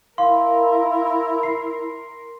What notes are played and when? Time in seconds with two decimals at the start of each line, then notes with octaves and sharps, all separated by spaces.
0.18 E4 A#4 F5 C6
1.43 C7